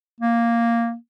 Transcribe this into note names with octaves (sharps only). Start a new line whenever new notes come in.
A#3